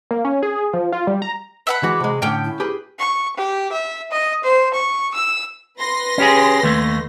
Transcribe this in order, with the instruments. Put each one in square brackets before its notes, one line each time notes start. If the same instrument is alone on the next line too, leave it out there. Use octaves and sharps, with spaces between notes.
[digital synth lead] A#3
C#4
G#4
F3
F4
G3
A#5
[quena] B4 [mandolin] E5 F#5 B5
[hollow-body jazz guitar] E3 G#3 F#4 [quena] D6
[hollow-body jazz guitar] C3 G#3
[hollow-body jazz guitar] A2 D3 [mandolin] C#4 G5
[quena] E4
[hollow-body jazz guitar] G4 G#4 B4
[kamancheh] C#6
G4
E5
D#5
C5
C#6
E6
[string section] B4 C6 A#6
[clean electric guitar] C#4 G4 G#4
D#2 A3